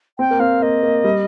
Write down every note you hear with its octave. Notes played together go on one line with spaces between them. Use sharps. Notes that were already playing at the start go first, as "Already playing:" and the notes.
C4 G5
A#3
C4 F5
A#3 D#5
A#3
G3